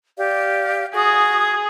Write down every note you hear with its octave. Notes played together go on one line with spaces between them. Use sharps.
G4 D5 F5
F#4 G#4 D#6